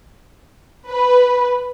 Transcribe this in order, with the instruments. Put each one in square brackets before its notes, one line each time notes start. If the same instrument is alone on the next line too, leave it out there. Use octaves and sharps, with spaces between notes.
[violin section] B4